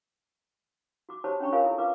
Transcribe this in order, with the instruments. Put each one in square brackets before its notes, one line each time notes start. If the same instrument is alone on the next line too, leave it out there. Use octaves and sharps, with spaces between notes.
[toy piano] F#4 D6
F#4 G4 C5 C#5 A5 B5
C#4 D4 C#5 G5 B5 C#6
F4 A#4 C#5 F5 G#5 B5
E4 A4
F4 B4 F5 D6